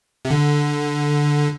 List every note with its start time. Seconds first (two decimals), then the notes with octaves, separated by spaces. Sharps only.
0.25 C3
0.31 D3